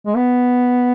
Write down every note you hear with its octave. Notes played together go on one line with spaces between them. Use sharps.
G#3
B3